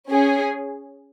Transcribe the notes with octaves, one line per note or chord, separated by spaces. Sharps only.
C#4 G#4